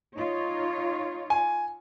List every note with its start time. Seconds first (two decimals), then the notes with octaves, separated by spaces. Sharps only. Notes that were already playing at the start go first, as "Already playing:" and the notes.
0.17 D#4 F4 C#5
1.30 G#5